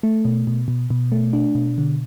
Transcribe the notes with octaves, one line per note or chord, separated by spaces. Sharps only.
A3
B2
B2
B2
B2
A3
D4
B2
D3